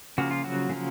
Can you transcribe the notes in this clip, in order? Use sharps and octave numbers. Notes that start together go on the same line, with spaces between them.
C#3 F3 A#3 F#4
F4
F#3 F#4
C#3 F3 A#3